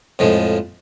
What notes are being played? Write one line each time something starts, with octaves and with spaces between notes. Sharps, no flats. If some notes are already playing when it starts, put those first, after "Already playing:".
F2 A2 F3 G#3